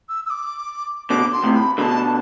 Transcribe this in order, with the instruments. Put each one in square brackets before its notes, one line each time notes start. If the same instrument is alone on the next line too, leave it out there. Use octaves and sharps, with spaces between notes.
[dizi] E6
E6
D6
[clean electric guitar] B2 D3 [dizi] D6
[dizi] C6
[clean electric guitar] A2 C3
[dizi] B5
[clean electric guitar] B2 D3 [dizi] A5 B5